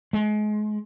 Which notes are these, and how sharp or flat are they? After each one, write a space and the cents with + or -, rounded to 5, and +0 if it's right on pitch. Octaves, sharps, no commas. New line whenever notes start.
G#3 +30